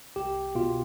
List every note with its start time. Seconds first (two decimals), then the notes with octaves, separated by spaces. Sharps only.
0.16 C2 G4
0.55 B2 F4